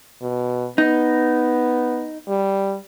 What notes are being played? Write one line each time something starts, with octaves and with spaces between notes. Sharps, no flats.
B2
B3 D#4
G3